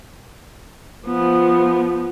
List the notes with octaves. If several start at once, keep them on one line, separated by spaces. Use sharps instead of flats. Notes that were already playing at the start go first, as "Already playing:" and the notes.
F3 B3